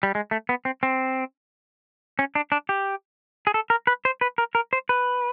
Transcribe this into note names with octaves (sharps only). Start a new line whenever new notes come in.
G3
G#3
A3
B3
C4
C4
C#4
D4
D4
G4
G#4
A4
A#4
B4
C5
B4
A#4
A#4
C5
B4